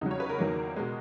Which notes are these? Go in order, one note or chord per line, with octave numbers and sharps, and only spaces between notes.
E2 C#3 F#3 D#4
C#5
B4
A#4
E2 D#3 F#3 A#3
B2 G#3